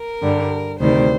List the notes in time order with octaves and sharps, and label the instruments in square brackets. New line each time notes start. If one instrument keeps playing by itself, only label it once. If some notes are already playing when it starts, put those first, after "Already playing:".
Already playing: [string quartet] A#4
G2 D3 G3
D2 C3 D#3 G3 C5